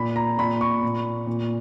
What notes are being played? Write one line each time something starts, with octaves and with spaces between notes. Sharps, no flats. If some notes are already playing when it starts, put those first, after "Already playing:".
Already playing: A#2 B5
A#5
A#2 B5
C#6
A#2
A#2